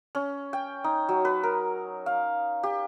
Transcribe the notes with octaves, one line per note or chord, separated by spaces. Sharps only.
C#4
G5
D#4
F#3
B4
A#4
F5
G4